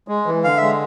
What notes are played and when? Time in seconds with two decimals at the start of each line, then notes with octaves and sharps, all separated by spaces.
0.08 G#3
0.26 E3
0.44 D3 F5
0.57 G#3 E5